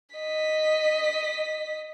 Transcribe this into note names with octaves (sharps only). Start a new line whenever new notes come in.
D#5 B6